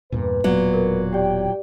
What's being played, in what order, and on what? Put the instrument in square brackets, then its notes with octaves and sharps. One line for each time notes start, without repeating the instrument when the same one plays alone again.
[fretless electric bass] E2 G2 A#2 [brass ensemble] B4
[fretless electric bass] E1 B3 [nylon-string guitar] A#2 F#3
[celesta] A#4
[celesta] G4 D5 [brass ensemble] G5